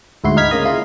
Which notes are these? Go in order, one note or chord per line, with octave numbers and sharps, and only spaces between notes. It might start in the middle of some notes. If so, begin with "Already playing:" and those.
D2 G#2 E4 F#4 C6
D#4 F5 F6 G#6 B6
C#3 A#3 D#5
G#3 E4 F4 C6